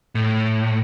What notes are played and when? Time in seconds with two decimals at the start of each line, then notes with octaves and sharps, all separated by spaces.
0.15 A2